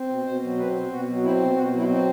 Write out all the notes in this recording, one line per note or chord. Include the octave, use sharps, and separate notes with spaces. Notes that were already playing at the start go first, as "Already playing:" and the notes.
Already playing: C4
B2
B2 C5
F#3
C4 B4
B2
B2 F#4
F#3
C4 E4
B2
B2 F#4
F#3
E4
C4